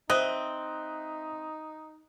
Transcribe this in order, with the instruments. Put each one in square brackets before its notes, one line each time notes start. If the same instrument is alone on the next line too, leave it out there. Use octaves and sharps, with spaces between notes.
[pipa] C4 [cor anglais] D#4 [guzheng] D#5 [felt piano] E5 F#6